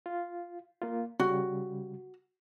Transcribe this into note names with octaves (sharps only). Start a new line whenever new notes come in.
F4
A#3 F4
C#3 G3 F#4